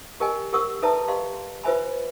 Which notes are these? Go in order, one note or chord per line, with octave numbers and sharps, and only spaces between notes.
G4 A#4 D#5 G5 G#5
G4 A#4 F#5 C#6 D#6 E6
A4 B4 D5 E5 A5 A#5
G4 D#5 F5 C6
F4 B4 C5 E5 G#5 B5